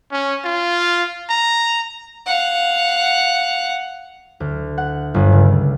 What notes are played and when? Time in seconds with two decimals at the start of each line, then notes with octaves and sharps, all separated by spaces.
0.11 C#4
0.45 F4
1.30 A#5
2.26 F5 F#5
4.40 D2
4.78 F#5
5.14 G1
5.32 C#2